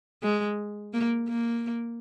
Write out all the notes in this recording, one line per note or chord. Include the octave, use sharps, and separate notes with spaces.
G#3
A#3
A#3